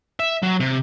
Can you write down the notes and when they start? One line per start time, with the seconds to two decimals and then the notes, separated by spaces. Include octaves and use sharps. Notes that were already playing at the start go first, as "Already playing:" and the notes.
0.20 E5
0.43 F#3
0.60 C3